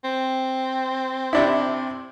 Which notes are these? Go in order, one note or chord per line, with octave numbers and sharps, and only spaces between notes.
C4
C3 D4 E4